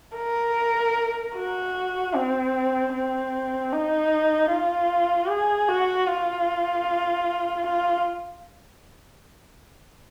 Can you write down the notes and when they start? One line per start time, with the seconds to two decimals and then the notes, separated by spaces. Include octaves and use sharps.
0.17 A#4
1.36 F#4
2.15 C4
2.94 C4
3.72 D#4
4.50 F4
5.30 G#4
5.68 F#4
6.08 F4
7.66 F4